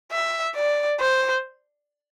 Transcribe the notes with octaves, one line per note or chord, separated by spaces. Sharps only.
E5
D5
C5